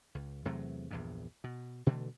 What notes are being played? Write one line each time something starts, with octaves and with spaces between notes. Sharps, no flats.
C#2
E2 C3 F#3 A3
A#1 E2 G2
B2
B2 D3 E3 A3